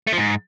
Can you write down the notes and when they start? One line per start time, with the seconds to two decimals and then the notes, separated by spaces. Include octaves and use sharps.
0.07 A3
0.12 F3
0.18 G#2